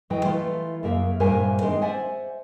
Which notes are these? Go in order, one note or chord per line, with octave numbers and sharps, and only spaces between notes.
A2 C#3 E3 F#3 D#5 G5
E3 A3 F4
F#2 C#3 A#3 E5
G2 A#2 A#4 C5 E5 G#5
D#3 G#3 C4 D4
C5 D5 E5 F#5 G#5